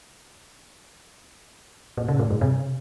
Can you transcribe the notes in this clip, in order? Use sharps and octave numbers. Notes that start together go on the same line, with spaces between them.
A#2
C#3
A2
G2
C3